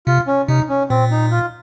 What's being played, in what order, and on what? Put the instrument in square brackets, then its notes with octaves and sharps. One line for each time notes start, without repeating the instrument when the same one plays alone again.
[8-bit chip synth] C3 [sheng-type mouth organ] F4
[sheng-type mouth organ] C#4
[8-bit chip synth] C3 [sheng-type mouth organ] D#4
[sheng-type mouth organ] C#4
[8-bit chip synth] A#2 [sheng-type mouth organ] C4
[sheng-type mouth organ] D#4
F4